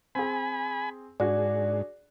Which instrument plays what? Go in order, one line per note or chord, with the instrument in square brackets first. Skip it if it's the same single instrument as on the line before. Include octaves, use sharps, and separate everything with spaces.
[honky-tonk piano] C4 G#4 [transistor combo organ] G#5 B5
[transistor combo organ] G#2 [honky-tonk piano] D4 F#4 G#4 [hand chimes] D5